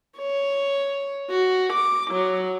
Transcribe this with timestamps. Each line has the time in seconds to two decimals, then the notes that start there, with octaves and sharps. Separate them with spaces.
0.18 C#5
1.30 F#4
1.73 D6
2.11 F#3